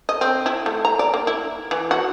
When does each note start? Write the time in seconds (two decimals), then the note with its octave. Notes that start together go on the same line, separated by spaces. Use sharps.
0.09 D#5
0.21 C4
0.46 E4
0.66 A3
0.85 A#5
0.99 D5
1.14 A#3
1.27 E4
1.71 E3
1.91 F#4